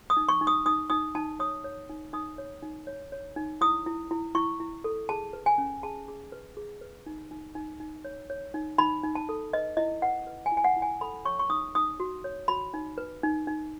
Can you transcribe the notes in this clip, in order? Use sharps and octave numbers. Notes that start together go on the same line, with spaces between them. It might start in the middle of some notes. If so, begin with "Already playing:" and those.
D#6
D#4
C#6
D#4
D#6
D#4 D#6
D#4 D#6
D#4 A5
C#5 D#6
C#5
D#4
D#4 D#6
C#5
D#4
C#5
C#5
D#4
E4 D#6
E4
E4
E4 C#6
E4
A4
G#4 A5
B4
G#5
C#4
G#4 A5
G#4
B4
G#4
B4
D#4
D#4
D#4
D#4
C#5
C#5
D#4
D#4 B5
D#4
A5
A4
B4 D#5
E4 D#5
B4 F#5
B4
G#5
E4
G#5
F#5
E4
G#5
A4 B5
C#5 C#6
C#6
D#4 D#6
D#4 D#6
F#4
C#5
F#4 B5
D#4
B4
D#4
D#4